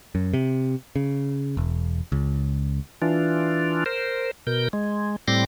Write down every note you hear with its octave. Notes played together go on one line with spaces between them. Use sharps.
F#2
C3
C#3
E1
C#2
E3 D4 F4
A#4 C5
B2 A#4 G6
G#3
A2 G3 C4 C6 D6 A#6